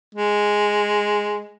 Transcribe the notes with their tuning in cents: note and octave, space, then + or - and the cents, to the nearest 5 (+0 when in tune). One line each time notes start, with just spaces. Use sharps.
G#3 +0